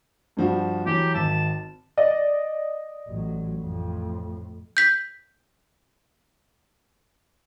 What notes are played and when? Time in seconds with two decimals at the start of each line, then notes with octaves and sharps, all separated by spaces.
0.37 G2 F3 F#4
0.86 E3 F#3 G4
1.15 G#1 A5
1.97 D5 D#5
3.08 A1 F#3
3.60 F2 A2
4.77 G6 B6